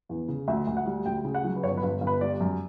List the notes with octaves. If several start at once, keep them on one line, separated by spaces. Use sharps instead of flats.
E2
C#3
D2 E5
D2
F#5
G3
D2 G5
C#3
F#5
F#3
B4
G1 C#5
B4
G1
G1
B4
G3 D5
F#2